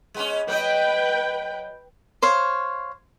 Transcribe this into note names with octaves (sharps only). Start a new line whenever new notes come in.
G#3 B3 C#4
F#3 B4 D#5 G5
C5 C#5 F5